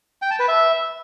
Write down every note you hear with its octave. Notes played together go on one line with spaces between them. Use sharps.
G5
A5
B4
E5